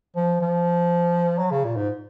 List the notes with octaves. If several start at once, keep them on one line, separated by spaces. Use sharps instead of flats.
F3
F3
F#3
C#3
A#2
G#2